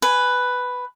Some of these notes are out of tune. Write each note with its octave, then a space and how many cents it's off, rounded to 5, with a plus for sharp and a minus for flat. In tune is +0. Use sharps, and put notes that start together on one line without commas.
B4 +5 G#5 +0